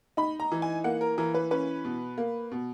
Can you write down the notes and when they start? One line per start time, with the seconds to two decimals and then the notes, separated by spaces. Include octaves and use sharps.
0.17 D#4 B5
0.40 A#5
0.52 E3
0.62 G#5
0.84 A#3 F#5
1.01 A#4
1.18 E3 A#4
1.34 B4
1.51 C#4 B4
1.85 B2
2.18 A#3
2.52 B2